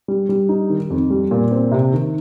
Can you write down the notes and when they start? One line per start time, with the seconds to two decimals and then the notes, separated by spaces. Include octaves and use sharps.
0.08 G3
0.29 G3
0.49 D#4
0.70 D#3
0.90 F2
1.10 G3
1.31 A#2
1.51 C4
1.72 C3
1.93 D#3